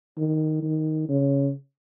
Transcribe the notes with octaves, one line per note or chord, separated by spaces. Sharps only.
D#3
D#3
C#3